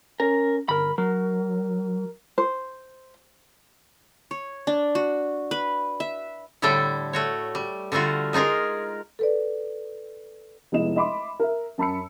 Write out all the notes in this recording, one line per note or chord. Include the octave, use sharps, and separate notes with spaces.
C#4 A#4
G1 A#4 B5
F#3 A#4
C5
C#5
D4
F#4
B4
E5
A2 D3 G3 E4 A4 G5
A3 F#4 C#5
G3
D3 G3 A3 F4 F#4
G#3 D#4 F4 G#4 A#4
A4 B4 D5
F1 G#3 B3 E4 D#5 E7
D#5 E5 B5 C6 D6
A#4 E5
F#2 A5 B5 E6 C#7